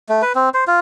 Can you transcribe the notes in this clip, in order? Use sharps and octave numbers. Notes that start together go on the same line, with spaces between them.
A3
B4
C4
C5
F4